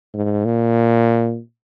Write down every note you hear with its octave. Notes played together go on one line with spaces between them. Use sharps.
G#2
A#2